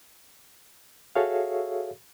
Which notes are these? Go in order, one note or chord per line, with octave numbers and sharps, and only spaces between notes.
F#4 G#4 A4 C#5 E5 F5